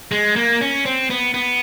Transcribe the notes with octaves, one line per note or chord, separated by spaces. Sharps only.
G#3
A#3
C#4
C4
B3
B3